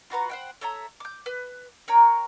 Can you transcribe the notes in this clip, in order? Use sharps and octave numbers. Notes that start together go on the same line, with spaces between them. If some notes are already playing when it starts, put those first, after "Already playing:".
F4 F#4 B4 A#5
C5 F#5 G5
A4 C#5 E5 A#5
D6 G6
B4
A#4 C#5 G5 A#5